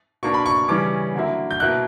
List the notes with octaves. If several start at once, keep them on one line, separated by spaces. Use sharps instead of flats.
B2 A#3 D4 C#6
B5
C#6
C#3 E3 G3 C#4 D6
D3 F#3 A#3 E4
G6
B2 A#3 E4 F#6